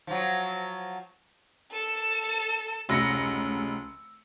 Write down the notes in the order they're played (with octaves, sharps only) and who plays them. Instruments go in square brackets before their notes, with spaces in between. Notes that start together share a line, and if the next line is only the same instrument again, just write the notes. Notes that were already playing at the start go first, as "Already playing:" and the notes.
[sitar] F3 F#3
[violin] A4 E7
[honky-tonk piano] F1 A#6 C#7 [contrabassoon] C#2 [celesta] E6